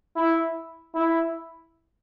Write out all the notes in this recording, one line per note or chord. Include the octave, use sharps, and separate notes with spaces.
E4
E4